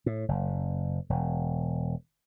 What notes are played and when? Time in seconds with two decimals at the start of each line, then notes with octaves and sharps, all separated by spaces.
0.06 A2
0.28 F#1
1.10 E1